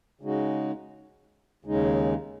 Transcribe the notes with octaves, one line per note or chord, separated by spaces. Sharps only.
C#3 G#3 D#4 F#4
D#2 C#3 G#3 D#4